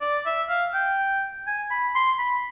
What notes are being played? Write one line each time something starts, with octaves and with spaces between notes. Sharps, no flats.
D5
E5
F5
G5
G#5
B5
C6
B5